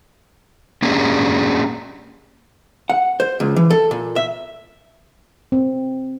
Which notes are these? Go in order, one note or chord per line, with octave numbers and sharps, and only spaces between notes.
A#3 C#4 D4 G4 G#4
F#5
C5
C#2
E3
A4
A#2
E5
C4